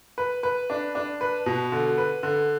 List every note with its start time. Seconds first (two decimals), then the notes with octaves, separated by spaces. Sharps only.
0.18 B4
0.43 B4
0.70 D4
0.95 D4
1.21 B4
1.46 B2
1.72 D3
1.98 B4
2.23 D3